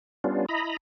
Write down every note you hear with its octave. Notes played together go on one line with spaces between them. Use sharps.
G3 B3 C#4 D4 F4
E4 D#5 A#5 B5